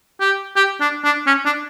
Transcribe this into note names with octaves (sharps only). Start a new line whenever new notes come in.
G4
G4
D4
D4
C#4
D4